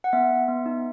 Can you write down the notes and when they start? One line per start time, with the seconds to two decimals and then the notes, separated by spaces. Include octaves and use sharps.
0.04 F#5
0.13 B3 E5
0.31 B3
0.48 B3
0.66 D#4